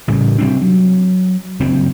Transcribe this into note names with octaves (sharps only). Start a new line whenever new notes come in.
A1 A2 C#3 G3
C3 G3 C4 D4
F#3
F#1 G2 C4